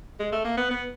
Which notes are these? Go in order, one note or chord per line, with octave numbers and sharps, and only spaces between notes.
G#3
A3
A#3
B3
B3